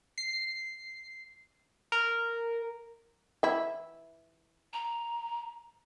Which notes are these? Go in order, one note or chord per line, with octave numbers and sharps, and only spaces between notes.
C7
A#4
E3 E4
A#5